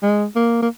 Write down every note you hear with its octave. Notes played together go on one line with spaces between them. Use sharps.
G#3
A#3
A#3